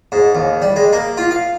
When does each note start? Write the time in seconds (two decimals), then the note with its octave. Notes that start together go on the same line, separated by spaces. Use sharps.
0.12 G#2
0.35 D#2
0.62 G3
0.76 G#3
0.93 A#3
1.17 F4
1.31 F5